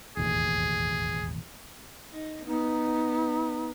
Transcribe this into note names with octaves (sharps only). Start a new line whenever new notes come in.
E1 A1 D#2 G#4
D#4
B3 D#4